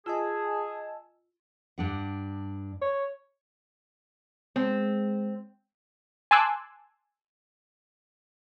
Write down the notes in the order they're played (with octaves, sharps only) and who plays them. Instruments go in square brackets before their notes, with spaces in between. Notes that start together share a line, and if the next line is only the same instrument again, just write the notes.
[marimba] F4 [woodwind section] G#4 [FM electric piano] D#5 G#5 E6 [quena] A5
[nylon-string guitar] G2 D4 F#5
[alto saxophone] C#5
[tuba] G#3 [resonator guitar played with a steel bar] C4
[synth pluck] G#5 A5 C6 D6 E6 F#6